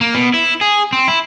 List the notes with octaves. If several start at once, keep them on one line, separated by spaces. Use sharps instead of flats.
A#3
B2
E4
G#4
C4
E4